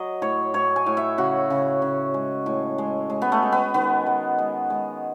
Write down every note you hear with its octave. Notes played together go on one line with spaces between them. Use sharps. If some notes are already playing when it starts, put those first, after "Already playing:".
Already playing: F#3 D#5
A2 C#5
A2 C#5
G#5
A2
E5
C#3 F#4
C#3
C#3
G#3
A2
G#3
G#3
B3
A3
G#3
B3
D#3 B3
G#3
G#3
G#3